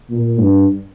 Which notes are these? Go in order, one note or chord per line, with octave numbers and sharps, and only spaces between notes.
A#2
G2